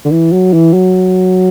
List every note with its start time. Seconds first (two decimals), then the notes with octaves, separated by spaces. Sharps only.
0.05 D3
0.11 E3
0.32 F#3
0.53 E3
0.73 F#3